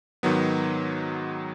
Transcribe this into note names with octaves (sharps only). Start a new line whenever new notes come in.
G#2 D#3 F#3 B3